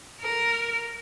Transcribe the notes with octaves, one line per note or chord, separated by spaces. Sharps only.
A#4